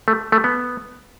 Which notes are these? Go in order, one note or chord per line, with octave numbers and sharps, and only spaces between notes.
A3
A3
B3